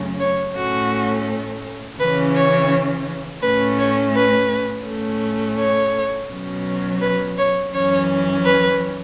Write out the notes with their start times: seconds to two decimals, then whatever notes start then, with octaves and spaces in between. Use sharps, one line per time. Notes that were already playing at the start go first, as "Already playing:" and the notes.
Already playing: F#2 C#3 A3 C#4
0.20 C#5
0.55 A2 A3 C#4 F#4
1.98 C#3 E3 C#4 B4
2.35 C#5
3.42 A2 A3 C#4 B4
3.78 C#5
4.15 B4
4.85 A2 A3 C#4
5.58 C#5
6.29 B2 F#3 C#4
7.01 B4
7.38 C#5
7.73 F#2 E3 C#4 C#5
8.44 B4